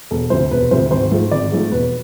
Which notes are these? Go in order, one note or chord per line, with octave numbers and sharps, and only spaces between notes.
E1 A4
D2 C3 F3 C5
E1 B4
D2 C3 F3 C5
G#1 C5
G#2 F3 A3
G#1 D5
G#2 F3 A3
E1 B4